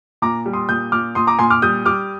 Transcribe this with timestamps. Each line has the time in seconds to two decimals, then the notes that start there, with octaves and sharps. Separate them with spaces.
0.22 A#2 A#5 D6
0.46 G3
0.53 C6 D#6
0.69 A#2 D#6 G6
0.92 A#2 D6 F6
1.15 A#2 C6 D#6
1.27 A#5 D6
1.39 A#2 G#5 C6
1.50 D6 F6
1.62 G3 D#6 G6
1.85 G3 D6 F6